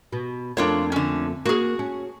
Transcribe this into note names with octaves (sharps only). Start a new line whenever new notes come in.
B2
F2 A3 A#3 D4 F4 C#5
D3 C#4
A#3 F#4 G#4
C#4